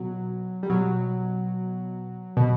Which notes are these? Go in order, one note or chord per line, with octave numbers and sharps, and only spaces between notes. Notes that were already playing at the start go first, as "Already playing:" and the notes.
Already playing: B2 F#3
G3
B2 F#3
B2